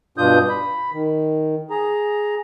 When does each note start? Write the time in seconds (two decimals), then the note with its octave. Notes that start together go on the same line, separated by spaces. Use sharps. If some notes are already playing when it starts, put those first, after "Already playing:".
0.18 G2 B2 D4 F4 D#6 G6
0.49 B5
0.93 D#3
1.70 G#4 A#5